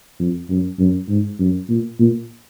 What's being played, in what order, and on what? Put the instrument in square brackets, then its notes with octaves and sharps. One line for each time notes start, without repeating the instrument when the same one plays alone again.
[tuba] F2
F#2
F#2
G#2
F#2
A#2
A#2